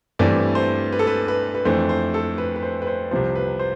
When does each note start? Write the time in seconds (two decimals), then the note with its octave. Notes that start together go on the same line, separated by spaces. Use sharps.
0.19 G2 E3 A3 C4 D5
0.55 C5
0.92 B4
0.99 A4
1.07 B4
1.28 B4
1.54 B4
1.65 F2 E3 A3 D4 C5
1.89 C5
2.14 A4
2.38 B4
2.56 B4
2.63 C5
2.82 B4
2.87 C5
3.11 C2 C3 F3 C5
3.35 B4
3.59 C5